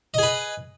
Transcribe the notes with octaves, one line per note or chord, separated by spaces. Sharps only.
G#4 B4 D#5